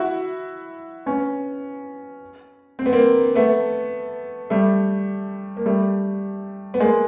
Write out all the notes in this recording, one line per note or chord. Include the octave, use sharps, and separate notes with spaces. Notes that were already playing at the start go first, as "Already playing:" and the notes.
Already playing: E4 F#4
B3 C#4
C4
B3
A#3 C4
A3 B3
G3 A3
A#3
G3 A3
B3
G#3 A#3